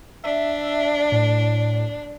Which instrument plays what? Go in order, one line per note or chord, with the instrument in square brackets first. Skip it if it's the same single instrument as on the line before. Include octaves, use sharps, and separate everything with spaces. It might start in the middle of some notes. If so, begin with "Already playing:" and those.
[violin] D4 [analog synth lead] E5
[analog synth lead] A2